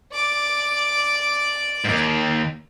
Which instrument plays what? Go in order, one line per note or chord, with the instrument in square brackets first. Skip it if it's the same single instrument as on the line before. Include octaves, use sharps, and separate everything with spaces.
[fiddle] D5 D6
[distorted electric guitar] D#2 G#2